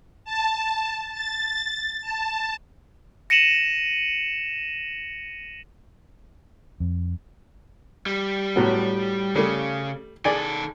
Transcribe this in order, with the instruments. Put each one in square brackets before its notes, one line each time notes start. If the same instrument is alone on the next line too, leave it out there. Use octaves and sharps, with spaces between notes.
[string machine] A5
A6
A5
[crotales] A#6 C#7 D#7 E7 F#7
[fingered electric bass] F2
[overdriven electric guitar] G3
[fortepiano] A2 F#3 B3
[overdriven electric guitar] C#3 [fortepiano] G3 A3
[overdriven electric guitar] D#3 A4 [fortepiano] G#4 D5 G#5